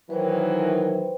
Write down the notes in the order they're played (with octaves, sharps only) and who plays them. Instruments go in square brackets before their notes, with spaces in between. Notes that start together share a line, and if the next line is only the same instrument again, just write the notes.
[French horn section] D#3 E3 F#3 [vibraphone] B4 C5 G5